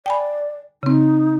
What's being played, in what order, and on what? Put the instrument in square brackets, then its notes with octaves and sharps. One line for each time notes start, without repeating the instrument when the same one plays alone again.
[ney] D5 [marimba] G5 G#5 B5
[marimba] C#3 C4 [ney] D#4